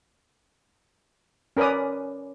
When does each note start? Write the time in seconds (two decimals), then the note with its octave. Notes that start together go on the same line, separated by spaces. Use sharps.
1.57 C#4 A#4 B4 D5 D#6